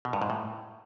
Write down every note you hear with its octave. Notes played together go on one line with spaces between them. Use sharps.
B2
G2
G#2
A2